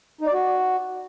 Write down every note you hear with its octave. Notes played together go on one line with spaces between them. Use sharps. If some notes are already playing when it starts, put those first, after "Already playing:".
D#4
D5
F#4